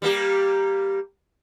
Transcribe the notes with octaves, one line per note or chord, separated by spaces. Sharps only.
G3 A#3 G4